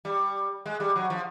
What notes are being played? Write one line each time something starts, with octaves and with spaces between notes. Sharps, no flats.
G3
G#3
G3
F#3
F3